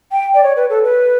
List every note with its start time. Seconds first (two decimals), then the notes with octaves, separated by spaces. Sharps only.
0.12 G5
0.34 D5
0.43 C#5
0.56 B4
0.70 A4
0.84 B4